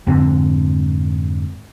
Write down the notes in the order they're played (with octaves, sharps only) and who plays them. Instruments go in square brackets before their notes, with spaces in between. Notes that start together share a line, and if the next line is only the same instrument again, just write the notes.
[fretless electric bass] F2 G#2 D3 C4